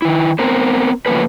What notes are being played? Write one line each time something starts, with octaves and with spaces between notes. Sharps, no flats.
D#3 E4
B3 C4 A#4 C5
C#3 F3 A3 A#3 G#4 B4